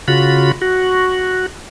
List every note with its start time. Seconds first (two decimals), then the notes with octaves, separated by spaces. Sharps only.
0.08 C#3 F4 F#4 B5
0.62 F#4